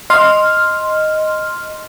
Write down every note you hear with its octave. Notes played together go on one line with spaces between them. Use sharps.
D#5 C6 F6